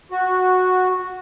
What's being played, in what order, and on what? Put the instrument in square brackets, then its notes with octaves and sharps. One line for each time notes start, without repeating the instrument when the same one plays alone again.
[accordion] F#4